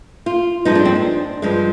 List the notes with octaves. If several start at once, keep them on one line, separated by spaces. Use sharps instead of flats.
F4
G2 F3 G#3 D#4
D4
C4
D4
G2 F3 G#3